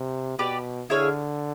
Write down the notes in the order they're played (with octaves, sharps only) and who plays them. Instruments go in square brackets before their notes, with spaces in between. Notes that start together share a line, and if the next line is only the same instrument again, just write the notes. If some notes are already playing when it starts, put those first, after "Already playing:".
Already playing: [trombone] C3
[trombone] B2 [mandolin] G4 B4 D5
[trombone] D3 [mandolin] E4 G#4 C#5 F5